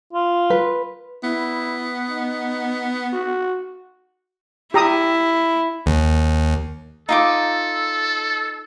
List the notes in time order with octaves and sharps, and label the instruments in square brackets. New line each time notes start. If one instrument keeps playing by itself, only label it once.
[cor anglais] F4
[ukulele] B4
[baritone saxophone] B3 [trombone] E4
[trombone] D#4
F#4
[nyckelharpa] E4 [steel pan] G4 A#5 D#6
[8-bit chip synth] D#2
[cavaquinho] D#4 F4 D6 [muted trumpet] A4